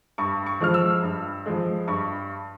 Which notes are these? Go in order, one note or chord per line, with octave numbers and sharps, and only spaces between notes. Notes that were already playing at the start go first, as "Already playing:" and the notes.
G2 C#6
C#6
F3 G#3 F6
E6
G2
F3 G#3
G2 C#6